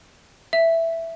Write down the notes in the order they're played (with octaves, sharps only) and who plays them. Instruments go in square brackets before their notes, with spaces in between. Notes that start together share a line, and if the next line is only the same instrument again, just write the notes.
[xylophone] E5